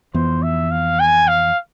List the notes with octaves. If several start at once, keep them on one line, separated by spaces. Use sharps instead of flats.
F2 E3 B3 C5
E5
F5
G#5
F5